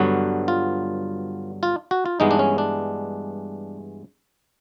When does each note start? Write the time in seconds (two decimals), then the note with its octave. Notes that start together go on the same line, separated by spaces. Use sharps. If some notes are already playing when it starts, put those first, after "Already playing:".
Already playing: G2 D3 F#3 B3 F#4
0.48 F4
1.63 F4
1.91 F#4
2.06 F4
2.20 G2 E3 G#3 B3 D#4
2.31 D4
2.39 C#4
2.58 D4